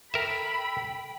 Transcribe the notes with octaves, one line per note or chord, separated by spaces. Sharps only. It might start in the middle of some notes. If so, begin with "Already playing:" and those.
A4 A#4 E5 G5 B5